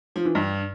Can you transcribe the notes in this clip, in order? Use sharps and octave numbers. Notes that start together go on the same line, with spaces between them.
F3
E3
G2